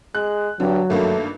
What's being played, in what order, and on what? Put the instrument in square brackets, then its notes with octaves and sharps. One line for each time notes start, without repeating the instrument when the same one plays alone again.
[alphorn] G#3 [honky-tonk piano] F#6
[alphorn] G2 [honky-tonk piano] D3 [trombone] F#3
[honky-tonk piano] G#1 G2 A#3 [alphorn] A3